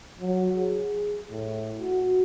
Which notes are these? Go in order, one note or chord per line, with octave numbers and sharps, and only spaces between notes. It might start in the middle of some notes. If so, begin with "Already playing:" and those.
F#3
G#4
A2
F#4